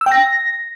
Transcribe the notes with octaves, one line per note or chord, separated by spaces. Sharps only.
E6
G5
A#6